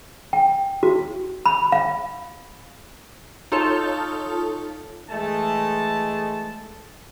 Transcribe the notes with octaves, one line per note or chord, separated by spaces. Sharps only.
G5
F#4
B5
F5
D#4 F4 A4 C#5 A5
E3 G#3 A3 A5